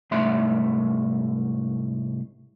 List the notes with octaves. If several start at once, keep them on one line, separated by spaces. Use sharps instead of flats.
C2 G#2 A3 E5 C6